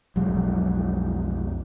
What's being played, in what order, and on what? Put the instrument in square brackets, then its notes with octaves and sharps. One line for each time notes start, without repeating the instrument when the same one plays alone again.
[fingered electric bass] B1 F2 F#3 G#3